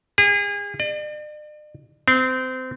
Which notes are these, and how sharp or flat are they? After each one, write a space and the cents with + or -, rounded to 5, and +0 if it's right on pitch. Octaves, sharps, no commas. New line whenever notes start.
G#4 -35
D5 +45
C4 -25